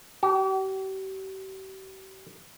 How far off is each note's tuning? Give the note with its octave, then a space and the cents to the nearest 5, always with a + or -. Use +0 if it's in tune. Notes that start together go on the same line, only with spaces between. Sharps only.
G4 -40